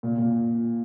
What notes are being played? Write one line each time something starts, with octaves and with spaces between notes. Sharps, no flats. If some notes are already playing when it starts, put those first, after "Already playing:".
A#2
A#2